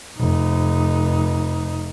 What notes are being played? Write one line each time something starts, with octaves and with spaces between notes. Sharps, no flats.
F1 D#4